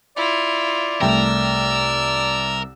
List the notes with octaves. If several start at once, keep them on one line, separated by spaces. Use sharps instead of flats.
E4 F4 D5
C2 A3 A#4 G5 E6